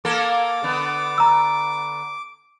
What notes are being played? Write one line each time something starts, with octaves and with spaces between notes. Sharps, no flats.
A#3 A4 A#4 D6
D3 B3
A#5 E6